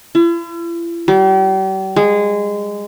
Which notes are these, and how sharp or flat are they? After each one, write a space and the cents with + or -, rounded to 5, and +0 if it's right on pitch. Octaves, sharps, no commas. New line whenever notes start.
E4 +45
G3 -40
G#3 -15